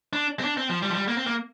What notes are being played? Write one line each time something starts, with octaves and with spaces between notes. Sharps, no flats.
D4
C4
D4
C4
F3
G3
F3
G3
A#3
C4
A#3